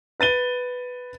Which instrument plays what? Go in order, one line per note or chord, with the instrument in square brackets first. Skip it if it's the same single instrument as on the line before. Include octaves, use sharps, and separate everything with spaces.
[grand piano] B4 A6 D#7 G7